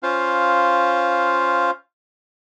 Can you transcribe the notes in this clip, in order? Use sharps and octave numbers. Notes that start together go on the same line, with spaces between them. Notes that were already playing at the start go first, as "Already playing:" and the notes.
C#4 F4 C5 F5